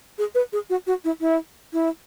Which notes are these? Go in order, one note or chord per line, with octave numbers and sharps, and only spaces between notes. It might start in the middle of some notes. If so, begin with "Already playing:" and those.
G#4
B4
G#4
F#4
F#4
E4
E4
E4